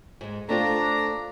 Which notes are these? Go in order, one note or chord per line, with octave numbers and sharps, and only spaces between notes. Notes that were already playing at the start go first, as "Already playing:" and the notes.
G#2 G#3
A3 C4 D4 F4 A#5